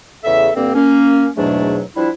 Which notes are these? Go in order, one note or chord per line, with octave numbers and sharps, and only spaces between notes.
E2 C#3 A4 E5
G2 D3 A#3 C4
A#3 C#4
E2 G#2 B2 F#3 A3 D4
F3 G3 D4 E4